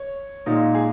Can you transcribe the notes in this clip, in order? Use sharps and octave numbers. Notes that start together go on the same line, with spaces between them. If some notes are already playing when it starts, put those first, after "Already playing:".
Already playing: C#5
A#2 G#3 D#4
G#4